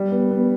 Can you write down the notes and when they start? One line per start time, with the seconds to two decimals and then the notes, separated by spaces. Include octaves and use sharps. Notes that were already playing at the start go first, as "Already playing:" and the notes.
Already playing: G3
0.12 B3
0.31 B3